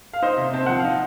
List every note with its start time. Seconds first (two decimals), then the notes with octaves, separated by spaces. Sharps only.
0.13 F5
0.22 D#4 C5 D#5
0.37 C3
0.53 C4 A5
0.66 F3 F#5
0.79 F5
0.84 D#4